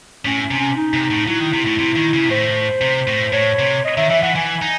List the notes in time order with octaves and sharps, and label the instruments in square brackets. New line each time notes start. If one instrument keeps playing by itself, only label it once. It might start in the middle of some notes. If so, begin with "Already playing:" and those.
[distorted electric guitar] A2 [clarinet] C#4
[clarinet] C#4
[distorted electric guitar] C3
[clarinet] C#4
D#4
[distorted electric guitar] C3
A2
[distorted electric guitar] F#3 [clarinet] E4
[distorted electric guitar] D#3
C3
A2
C3
D#3
C#3
C3
[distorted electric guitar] A2 [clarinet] C5
[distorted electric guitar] C3
A2
[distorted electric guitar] A2 [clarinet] C#5
[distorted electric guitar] C3
[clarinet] D#5
[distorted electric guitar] D#3 [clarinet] E5
[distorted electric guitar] E3 [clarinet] E5
[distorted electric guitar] E3 [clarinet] F#5
[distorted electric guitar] E3 [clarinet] G#5
[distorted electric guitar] D#4